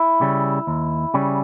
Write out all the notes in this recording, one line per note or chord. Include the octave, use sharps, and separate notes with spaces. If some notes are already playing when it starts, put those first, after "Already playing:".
Already playing: E4
C#3 G3 C#4
D#2
C#3 G3 C#4